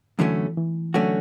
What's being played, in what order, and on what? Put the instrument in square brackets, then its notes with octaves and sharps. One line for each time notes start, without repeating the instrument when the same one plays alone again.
[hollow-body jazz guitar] F#2 D3 F#3 A3 C#4 [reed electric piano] E3
[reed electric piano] E3
[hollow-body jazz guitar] D3 A3 C#4 F#4 [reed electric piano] F#3